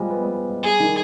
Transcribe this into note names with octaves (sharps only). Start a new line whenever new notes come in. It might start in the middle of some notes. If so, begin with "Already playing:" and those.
Already playing: F3 G3 G#3
B3
G#3
B3
G#3
G3 G#4
D#3